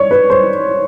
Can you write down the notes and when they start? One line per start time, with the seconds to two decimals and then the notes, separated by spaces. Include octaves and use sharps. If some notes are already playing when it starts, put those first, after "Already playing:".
Already playing: C#5 D5
0.11 B4
0.30 C5